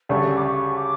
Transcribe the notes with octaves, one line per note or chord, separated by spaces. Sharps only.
D2 C#3 G3 D4 A4 C#6
D6
C#6
D6